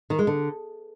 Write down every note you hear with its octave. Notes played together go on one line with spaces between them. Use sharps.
D#3
G#3
D3